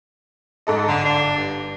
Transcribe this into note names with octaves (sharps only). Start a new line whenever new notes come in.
G#2 A4 D#5
G1 D3
D4
G2